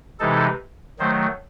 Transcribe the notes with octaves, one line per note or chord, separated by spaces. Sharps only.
C3 E3 G#3 D#4 A4
D#3 F#3 A3 C5